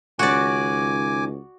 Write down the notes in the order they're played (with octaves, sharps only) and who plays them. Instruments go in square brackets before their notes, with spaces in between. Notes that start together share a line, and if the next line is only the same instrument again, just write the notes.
[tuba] C#2 [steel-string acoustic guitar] D#3 G#3 C#4 [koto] F#4 D5 [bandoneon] G#5 D6